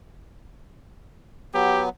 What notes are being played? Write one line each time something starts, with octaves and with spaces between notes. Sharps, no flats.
F#3 B3 G4